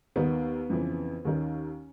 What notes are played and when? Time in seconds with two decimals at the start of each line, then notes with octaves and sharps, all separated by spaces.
0.16 D#2 D#3 B3
0.70 F2 C#3 E3
1.25 D#2 D#3 C#4